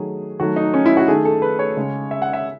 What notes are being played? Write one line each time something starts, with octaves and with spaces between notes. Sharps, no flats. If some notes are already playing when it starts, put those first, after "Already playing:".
Already playing: D#3 F#3 A3 G#4
D#3 F#3 A3 F#4
D#4
C#4
E4
F#4
D#3 A3 G#4
A4
B4
C#5
C#3 G#3
E5
F#5
E5